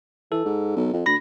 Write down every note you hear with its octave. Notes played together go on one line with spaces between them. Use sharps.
E3 A4
G#2
B1
F2
D2 B5 A#6